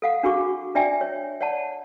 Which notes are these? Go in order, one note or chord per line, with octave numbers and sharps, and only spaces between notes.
A4 F5 F#5
D4 F#4 G#4 C#6 D6
D4 D5 E5 G5 G#5
C#5
C#5 D5 F#5 A5